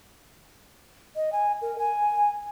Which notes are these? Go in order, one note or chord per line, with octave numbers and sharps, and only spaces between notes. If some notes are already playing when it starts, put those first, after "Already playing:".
D#5
G#5
A#4
G#5